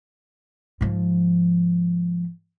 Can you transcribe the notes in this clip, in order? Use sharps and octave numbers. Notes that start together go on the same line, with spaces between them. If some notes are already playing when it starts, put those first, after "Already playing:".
G#2 F3